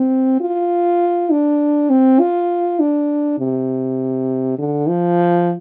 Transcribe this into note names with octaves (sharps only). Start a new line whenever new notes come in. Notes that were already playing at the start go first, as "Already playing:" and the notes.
Already playing: C4
F4
D4
C4
F4
D4
C3
D3
F3